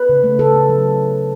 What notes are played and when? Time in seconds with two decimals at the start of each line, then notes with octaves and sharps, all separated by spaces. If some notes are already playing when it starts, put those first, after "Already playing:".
Already playing: B4
0.09 C#3
0.24 A3
0.39 C#3 A4
0.54 C#3
0.69 F#3